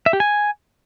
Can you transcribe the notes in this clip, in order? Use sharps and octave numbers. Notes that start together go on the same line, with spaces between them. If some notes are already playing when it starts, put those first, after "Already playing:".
E5
G4
G#5